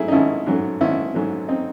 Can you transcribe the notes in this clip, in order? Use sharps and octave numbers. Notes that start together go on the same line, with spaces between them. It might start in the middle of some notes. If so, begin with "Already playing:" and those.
Already playing: G#2 F#3 A3 E4 G#4
D#4
G#1 C#4 E4
G#2 F#3 A3
G#1 C#4 E4
G#2 F#3 A3
C4 D#4